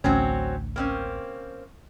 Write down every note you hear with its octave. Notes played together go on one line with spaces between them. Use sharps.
A1 D2 F#3 C4 C#4
A#3 C4 C#4